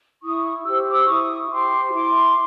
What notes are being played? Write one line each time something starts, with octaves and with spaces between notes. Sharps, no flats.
E4 C#6 D#6
G4 C5 E6
D6 E6
E4 C#6 D#6
G4 C5 C6 D6
E4 C6 D6